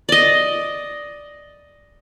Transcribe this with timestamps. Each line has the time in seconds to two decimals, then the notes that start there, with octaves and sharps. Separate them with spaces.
0.09 D5 D#5